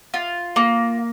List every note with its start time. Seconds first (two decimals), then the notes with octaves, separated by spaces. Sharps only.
0.14 F4
0.56 A#3